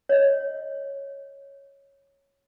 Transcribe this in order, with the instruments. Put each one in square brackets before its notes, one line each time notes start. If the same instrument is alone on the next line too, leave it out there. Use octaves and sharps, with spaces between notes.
[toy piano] C#5 D#5